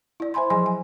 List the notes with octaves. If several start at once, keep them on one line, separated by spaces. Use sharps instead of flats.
E4 D5
C5 E5 G#5 B5 C6
F3 F#3 G#4 D#5 G#5 C6
G#5